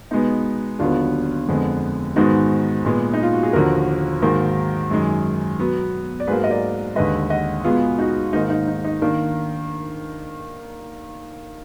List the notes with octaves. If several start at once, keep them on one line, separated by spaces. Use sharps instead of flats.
B2 G#3 B3 D#4
D#2 D3 F#3 B3 D4 F4
F2 D3 G#3 B3
G#2 D#3 G#3 B3 D#4 F#4
A#2 G#3 B3
D#4
F4
F#4
G#4
D#2 D3 F3 F#4 A#4
G#2 D#3 F#3 A#3
F#2 D#3 G#3
B2 F#3 B3
D5
G#2 F#3 A#3 G#4 B4
D#5
A#4 D5
D#2 D3 G#3 B4 D#5
D#5 F#5
B2 G#3 B3 F4 G#4
D#4 F#4
G#2 D#3 A#3 D#4
D#4
D#4
D#4
D#3 A#3 D4